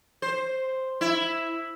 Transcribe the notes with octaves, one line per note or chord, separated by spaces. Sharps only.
C5
E4